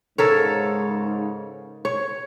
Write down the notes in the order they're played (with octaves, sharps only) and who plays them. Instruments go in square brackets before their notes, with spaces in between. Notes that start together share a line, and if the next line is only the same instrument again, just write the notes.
[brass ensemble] G#2 C#3 [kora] A4 A#4 C#5
[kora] C#5